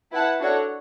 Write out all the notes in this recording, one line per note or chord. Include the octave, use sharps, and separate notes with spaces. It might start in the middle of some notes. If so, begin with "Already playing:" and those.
E4 B4 F#5 A5
D4 F#4 A4 C#5 F#5